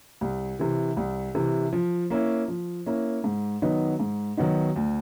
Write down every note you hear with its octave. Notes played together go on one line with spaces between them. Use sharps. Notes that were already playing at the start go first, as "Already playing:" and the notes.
C2
C3 E3
C2
C3 E3
F3
A#3 C#4 E4
F3
A#3 C#4 E4
G#2
D#3 F#3 B3 D#4
G#2
D#3 F#3 B3 D#4
D2